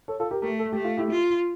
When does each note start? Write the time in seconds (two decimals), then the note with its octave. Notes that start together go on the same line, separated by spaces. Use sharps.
0.08 A4 C#5
0.20 F4 A4
0.31 G4 A#4
0.42 A3 G4 A#4
0.59 A4
0.72 A3 G4
0.84 F4
0.97 E4 G4
1.11 F4